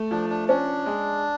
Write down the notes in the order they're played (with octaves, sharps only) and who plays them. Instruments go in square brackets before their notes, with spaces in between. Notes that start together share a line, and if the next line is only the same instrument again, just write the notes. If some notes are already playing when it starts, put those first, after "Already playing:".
Already playing: [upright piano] A3
[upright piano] F3 [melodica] D4
[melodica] D4
[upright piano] C#4 [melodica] D4
[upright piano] G#3